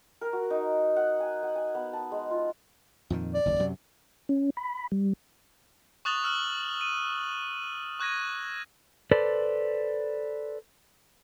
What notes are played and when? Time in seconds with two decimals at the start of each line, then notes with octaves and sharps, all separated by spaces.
0.21 A#4
0.33 F#4
0.50 D#4
0.96 F#5
1.20 G#5
1.43 F#5
1.56 G#5
1.75 B3
1.93 A5
2.12 G#3
2.31 F4
3.10 F2 A#2 D#3
3.34 D5
3.45 F#1 D#2
3.59 F#2 C3 F#3
4.29 C#4
4.57 B5
4.92 G3
6.05 C#6 D#6 F#6 A6 F7 G7
6.24 E6 F6 F7 F#7
6.81 D#7
8.00 C#6 F#6 G#6 A#6 D#7
9.11 A4 B4 C5 D5